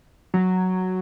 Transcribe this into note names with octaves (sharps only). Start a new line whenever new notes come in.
F#3